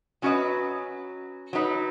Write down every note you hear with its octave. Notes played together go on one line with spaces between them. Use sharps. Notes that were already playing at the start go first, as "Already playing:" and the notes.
F#3 C#4 F#4 B4 D#5
F#3 D#4 B4